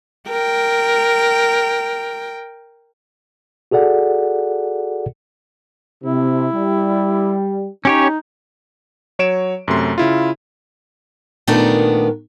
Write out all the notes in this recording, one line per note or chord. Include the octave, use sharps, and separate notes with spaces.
A#4 G5
F#4 G#4 A4 D5 F#5
C3 E4
G3
C#4 D#4 G4 C#5
F#3 C#5 D7 E7
F#2 C3 A3 C6
C#3 E4 F4
A#2 D#3 A3 B3 D4 A#4